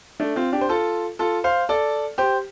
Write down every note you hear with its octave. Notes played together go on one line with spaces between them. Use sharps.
A3 D4
C4 F4
D4 G4
C5
F4 A4
F4 A4
C5 F5
A4 D5
G4 C5